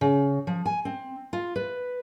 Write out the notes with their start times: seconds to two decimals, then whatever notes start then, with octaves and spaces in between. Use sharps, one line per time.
0.01 C#3
0.47 F3
0.66 G#5
0.85 C4
1.33 F4
1.56 B4